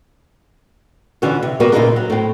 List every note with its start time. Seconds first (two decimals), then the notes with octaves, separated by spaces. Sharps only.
1.22 D3 E3 C#4 F4 F#4
1.43 C3
1.60 G3 A#3 B3 F#4 A#4 B4
1.73 A#2 C#3 C4 D#4 E4 A#4
1.96 F#3
2.10 A2 C4